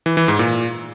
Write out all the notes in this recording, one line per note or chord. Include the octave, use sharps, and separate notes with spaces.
E3
E3
G#2
A#2